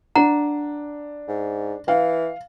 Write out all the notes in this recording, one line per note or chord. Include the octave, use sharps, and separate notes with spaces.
D4 F#5 A#5
G#2
E3 F5